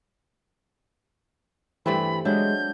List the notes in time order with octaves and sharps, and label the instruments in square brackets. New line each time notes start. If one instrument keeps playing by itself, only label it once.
[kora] G2 A3 C4 [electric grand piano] E3 [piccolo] B5
[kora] F#3 E4 [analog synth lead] G#3 [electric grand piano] D4 [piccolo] G6